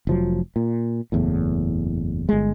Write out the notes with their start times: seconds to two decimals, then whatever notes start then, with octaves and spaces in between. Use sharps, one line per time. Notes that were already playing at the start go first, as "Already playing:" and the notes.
0.07 F1 F3 F#3
0.56 A#2
1.12 F#1 E2 A2
2.29 G1 G#3